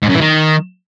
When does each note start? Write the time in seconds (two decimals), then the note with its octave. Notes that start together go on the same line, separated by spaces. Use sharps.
0.02 G#2
0.08 F#2
0.15 E3
0.21 D#3